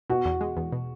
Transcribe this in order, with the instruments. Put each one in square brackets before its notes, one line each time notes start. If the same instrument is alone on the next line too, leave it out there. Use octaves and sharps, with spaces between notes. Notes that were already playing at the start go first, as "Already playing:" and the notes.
[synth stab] B2 [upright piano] F#4
[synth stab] E2
G#3
E2
B2